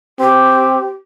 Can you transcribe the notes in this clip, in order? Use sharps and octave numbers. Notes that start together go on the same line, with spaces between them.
C4 G4